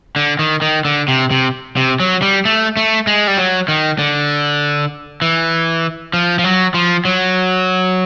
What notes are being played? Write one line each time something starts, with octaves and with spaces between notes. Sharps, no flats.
D3
D#3
D#3
D3
C3
C3
C3
F#3
G3
A3
A3
G#3
G3
F#3
D#3
D3
E3
F3
F3
F#3
F3
F#3